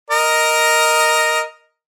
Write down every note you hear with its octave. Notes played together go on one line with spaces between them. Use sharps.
A#4 D#5